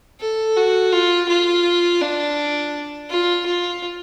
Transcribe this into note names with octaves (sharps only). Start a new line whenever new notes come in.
A4
F#4
F4
F4
D4
F4
F4